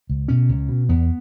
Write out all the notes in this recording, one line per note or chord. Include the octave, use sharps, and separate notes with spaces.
C#2
B2 C#4
C#2
B2
E2 B3